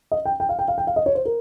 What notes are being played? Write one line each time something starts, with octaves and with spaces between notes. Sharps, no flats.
D#5
G5
G5
F5
G5
F5
G5
F5
D#5
C#5
C5
A#4